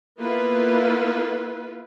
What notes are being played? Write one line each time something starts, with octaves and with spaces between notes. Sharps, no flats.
A#3 B3 E4 F4 A4 B4